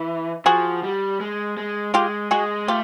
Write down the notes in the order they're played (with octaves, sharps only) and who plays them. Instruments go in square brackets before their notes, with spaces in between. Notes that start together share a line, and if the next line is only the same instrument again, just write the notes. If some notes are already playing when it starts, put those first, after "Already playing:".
Already playing: [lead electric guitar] E3
[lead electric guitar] F3 [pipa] F#4 G#4
[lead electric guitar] G3
G#3
G#3
[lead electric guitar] G#3 [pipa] F4 G4
[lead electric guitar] G#3 [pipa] F#4 G#4
[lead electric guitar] A3 [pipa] F4 G4